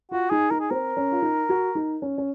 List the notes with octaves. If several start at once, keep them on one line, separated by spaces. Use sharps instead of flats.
F4 F#4
D#4 G#4
D#4 A#4
G#4
C4 A#4
C#4
F4
D#4
F#4
D#4
C#4
C#4